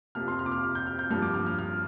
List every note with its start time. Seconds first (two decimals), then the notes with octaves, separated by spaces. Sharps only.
0.15 F2 C3 F3 A#3 F6
0.28 C6
0.39 F6
0.46 D6
0.52 F6
0.63 F6
0.75 G6
0.87 F6
0.99 G6
1.10 G2 F3 A#3 F6
1.22 D6
1.34 F6
1.47 F6
1.59 F6